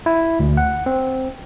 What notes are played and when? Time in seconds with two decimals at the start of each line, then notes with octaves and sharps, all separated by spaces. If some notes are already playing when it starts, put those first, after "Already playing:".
0.06 E4
0.40 D2
0.57 F#5
0.86 C4